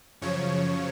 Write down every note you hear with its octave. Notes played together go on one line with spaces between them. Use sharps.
F#2 C#3 F3 C#5